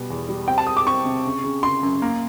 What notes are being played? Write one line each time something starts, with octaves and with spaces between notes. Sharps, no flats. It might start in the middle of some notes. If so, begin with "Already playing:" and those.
Already playing: B2 G3 B3
E2
G3
C4 G5
A5
G#3 D#6
D6
C4 C#6
C3
C#3
C#3
C#3 C6
F#2
A#3